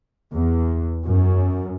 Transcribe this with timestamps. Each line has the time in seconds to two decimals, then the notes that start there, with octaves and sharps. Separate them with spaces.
0.32 E2
1.05 F#2